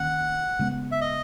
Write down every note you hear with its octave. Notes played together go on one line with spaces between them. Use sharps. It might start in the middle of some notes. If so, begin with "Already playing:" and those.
Already playing: D#3 A#3 C#4 F#5
C#3 G#3 B3
E5
D#5